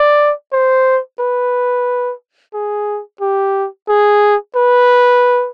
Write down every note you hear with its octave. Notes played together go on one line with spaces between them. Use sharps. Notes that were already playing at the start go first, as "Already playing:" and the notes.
Already playing: D5
C5
B4
G#4
G4
G#4
B4